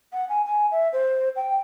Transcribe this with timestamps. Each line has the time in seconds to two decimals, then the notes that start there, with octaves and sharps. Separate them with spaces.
0.13 F#5
0.29 G#5
0.45 G#5
0.71 E5
0.93 C5
1.36 G5